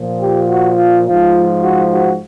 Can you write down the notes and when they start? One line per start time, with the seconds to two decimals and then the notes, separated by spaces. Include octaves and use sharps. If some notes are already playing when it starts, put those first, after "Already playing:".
Already playing: A#2 F3
0.20 G4
0.48 F#4
0.77 F4
1.05 G#2 F3 F4
1.63 F#4
1.91 F#4